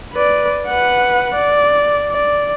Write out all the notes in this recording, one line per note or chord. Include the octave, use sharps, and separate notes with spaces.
B4 D5
B4 F#5
D5
D5